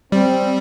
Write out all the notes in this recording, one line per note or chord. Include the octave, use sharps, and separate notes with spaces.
G3 C4